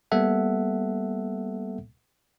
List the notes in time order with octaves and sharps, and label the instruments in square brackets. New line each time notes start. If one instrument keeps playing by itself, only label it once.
[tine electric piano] G3 A#3 B3 A4 E5 F#5